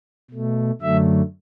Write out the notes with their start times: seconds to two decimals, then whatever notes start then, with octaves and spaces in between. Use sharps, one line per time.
0.31 B2 A3
0.81 F#2 D3 F#3 A3 E5